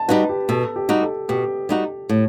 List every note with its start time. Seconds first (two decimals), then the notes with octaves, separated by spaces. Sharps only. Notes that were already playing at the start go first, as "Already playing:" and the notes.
Already playing: A5
0.08 G3 D#4 F#4 B4
0.29 G4
0.49 B2 A4
0.76 G4
0.89 G3 D#4 F#4
1.02 A4
1.29 B2 G4
1.69 G3 D#4 F#4
2.09 A2